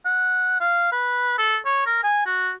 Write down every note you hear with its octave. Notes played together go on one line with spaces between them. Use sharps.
F#5
F5
B4
A4
C#5
A#4
G#5
F#4